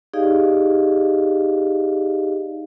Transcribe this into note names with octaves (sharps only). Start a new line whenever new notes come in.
D#4 G4 G#4 D5 D#5 F5